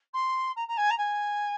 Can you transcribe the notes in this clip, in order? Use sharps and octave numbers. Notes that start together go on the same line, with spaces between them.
C6
A#5
A#5
G#5
A#5
G#5